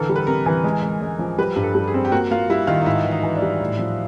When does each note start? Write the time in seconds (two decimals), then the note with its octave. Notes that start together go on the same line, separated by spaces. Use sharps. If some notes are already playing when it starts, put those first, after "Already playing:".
Already playing: D3 E3 A4 A#4
0.09 G3
0.16 B4
0.27 C3 A#4
0.46 E3
0.64 G#3
0.82 G#3
1.02 G#3
1.19 F3
1.38 G3 B4
1.56 G2
1.63 A4
1.75 G3
1.88 G#4
1.94 C4
2.05 G4
2.12 A#3 F#4
2.31 A#3 F4
2.50 G3 E4
2.67 D#3 F4
2.81 D#4
2.86 G#2 E4
3.05 E3
3.11 D#4
3.23 E3
3.35 D4
3.42 G3
3.60 A2
3.79 F3